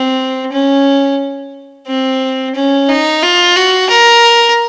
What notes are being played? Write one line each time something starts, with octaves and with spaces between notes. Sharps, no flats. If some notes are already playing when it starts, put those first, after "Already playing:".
Already playing: C4
C#4
C4
C#4
D#4
F4
F#4
A#4